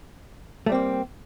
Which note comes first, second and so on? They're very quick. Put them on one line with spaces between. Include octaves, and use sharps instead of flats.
A3 G3 C4 A#3